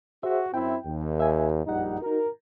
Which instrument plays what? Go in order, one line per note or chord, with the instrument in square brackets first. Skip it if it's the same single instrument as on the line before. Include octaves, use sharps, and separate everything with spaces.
[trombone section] F#4 [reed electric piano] G#4 C5 E5
[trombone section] F#2 C4 E4 [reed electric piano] G5
[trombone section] D#2
[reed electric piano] A#4 E5 G#5
[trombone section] A#1 G3 D#4 [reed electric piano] F#2 F#5
[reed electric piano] D#4 F#4 [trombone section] A#4